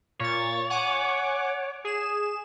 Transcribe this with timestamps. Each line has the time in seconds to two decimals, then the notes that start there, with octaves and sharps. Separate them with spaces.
0.20 A#2 C#5 A6
0.70 F#5 G#5 D6
1.84 G#4 E7